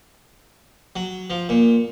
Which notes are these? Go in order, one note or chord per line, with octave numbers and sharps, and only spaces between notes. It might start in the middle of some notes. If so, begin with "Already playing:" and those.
F#3
F3
A#2